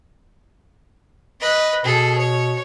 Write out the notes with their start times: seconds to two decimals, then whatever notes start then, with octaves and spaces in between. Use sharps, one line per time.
1.41 B4 D#5
1.85 B2 G#4 A4
2.18 C#5